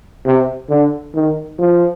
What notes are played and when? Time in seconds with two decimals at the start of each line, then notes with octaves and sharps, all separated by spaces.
0.25 C3
0.69 D3
1.15 D#3
1.59 F3